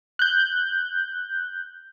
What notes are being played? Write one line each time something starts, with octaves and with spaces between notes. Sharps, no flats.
F#6 G6